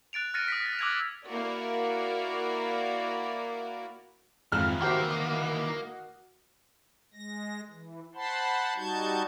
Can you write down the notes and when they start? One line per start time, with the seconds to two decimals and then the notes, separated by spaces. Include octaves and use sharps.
0.13 F#6 A6 D7 F7
0.34 F6 F#6 A6 A#6 C#7 D#7
0.48 D#6 A#6 B6
0.66 A6 A#6
0.79 D6 E6 F#6 G#6 A#6 F7
1.25 A#3 E4 F#4 A#4 D5
4.52 F2 G#2 D#3 E3 F6
4.82 A#3 F#4 G4 C5 E5
5.10 D#5
7.14 G#3 A#6
7.70 E3
8.15 C5 F#5 A5 B5 C6
8.77 G3 D#4 F#4 A5 G6 G#6